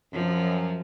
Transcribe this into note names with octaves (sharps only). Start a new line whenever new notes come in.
F#2 F3